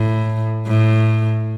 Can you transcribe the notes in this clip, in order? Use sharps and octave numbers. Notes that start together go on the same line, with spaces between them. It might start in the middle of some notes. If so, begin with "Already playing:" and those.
Already playing: A2
A2